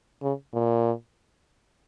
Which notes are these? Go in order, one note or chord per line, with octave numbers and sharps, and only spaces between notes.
C#3
A#2